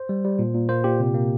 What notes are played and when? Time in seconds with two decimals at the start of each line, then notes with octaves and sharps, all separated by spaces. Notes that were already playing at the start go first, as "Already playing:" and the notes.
Already playing: C5
0.09 G3
0.24 G3
0.39 A#2
0.55 A#2
0.69 A#3 C5
0.84 A#2 G4
1.00 C3
1.14 A#3